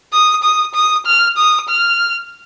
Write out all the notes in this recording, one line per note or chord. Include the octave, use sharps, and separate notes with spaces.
D#6
D#6
D#6
F6
D#6
F6